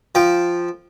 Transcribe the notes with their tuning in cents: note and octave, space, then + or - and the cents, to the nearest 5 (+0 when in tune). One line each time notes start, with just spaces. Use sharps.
F3 +0 G5 +0